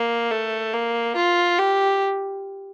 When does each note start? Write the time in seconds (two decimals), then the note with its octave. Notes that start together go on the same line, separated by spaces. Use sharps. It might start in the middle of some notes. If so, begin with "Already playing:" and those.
Already playing: A#3
0.31 A3
0.74 A#3
1.16 F4
1.59 G4